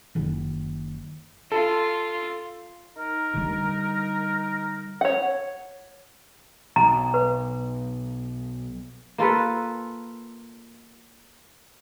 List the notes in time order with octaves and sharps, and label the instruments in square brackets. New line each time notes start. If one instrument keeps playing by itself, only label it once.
[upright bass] F#1 D#3
[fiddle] F4 [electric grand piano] A4
[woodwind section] D#4 A#4
[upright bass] D3 G3
[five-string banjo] C#5 F#5
[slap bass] B1 [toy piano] A#5
[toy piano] B4
[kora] A#3 F4 A4 B4